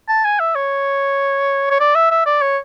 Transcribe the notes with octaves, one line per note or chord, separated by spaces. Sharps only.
A5
G#5
E5
C#5
C#5
D5
E5
E5
D5
C#5